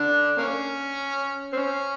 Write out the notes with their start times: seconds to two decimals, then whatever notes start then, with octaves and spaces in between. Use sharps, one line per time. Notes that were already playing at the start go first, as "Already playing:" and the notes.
Already playing: D3 D4
0.38 A#3 C#4
1.53 C4
1.56 C#4